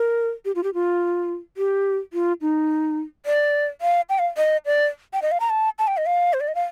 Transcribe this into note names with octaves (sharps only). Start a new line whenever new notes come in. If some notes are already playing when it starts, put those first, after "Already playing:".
Already playing: A#4
G4
F4
G4
F4
G4
F4
D#4
D5
F5
G5
F5
D#5
D5
G5
D#5
F5
A#5
A5
A5
G5
D#5
F5
C5
D5
D#5
F5